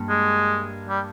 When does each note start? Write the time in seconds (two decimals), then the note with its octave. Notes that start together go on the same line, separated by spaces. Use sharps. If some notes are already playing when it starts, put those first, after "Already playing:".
Already playing: G2 A#3
0.09 G#3
0.89 G3